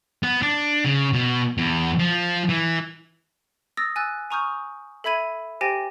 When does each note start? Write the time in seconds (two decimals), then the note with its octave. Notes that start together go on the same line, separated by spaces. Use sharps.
0.23 B3
0.42 D4
0.85 C#3
1.13 B2
1.58 E2
1.99 F3
2.49 E3
3.77 D#6 E6 A6 A#6
3.96 G#5 E6 F#6 A6
4.31 G#5 A#5 C#6 D#6 F6 G6
5.04 A4 E5 B5 G#6 D#7
5.61 G4 C5 G5 G#5 A6 A#6